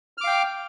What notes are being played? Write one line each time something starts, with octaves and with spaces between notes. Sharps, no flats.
F5 G5 D6 F6